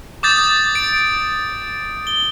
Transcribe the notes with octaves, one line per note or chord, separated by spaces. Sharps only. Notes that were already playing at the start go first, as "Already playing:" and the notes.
D6 D#6 G6 A6
D7
G7